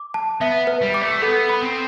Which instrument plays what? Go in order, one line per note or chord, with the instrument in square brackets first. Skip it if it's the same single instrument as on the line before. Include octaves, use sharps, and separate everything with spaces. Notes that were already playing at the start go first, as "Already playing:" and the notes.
Already playing: [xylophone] D6
A5
[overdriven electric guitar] B3 [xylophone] E5
[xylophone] B4
[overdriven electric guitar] G3
[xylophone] D6
[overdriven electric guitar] A3
[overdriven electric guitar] B3 [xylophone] A4
[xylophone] B5
[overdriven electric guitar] C4